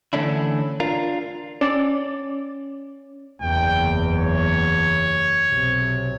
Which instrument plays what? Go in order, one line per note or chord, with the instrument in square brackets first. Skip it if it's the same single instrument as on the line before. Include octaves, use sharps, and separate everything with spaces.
[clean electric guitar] D3 E3 A3 C#4 D4 E4
D4 F4 A#4
[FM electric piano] C#4 [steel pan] D5
[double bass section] F#1 E2 [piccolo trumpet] G5
[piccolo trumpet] C#5
[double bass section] B1 C3